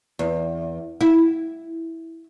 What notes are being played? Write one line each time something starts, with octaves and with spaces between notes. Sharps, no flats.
E2
E4